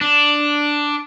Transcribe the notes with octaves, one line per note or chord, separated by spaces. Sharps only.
D4